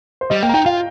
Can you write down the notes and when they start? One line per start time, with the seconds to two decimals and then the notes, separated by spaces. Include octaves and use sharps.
0.21 C5
0.30 G3 D#5
0.43 A#3 G5
0.49 A#5
0.54 D#4 G5
0.66 F4 F5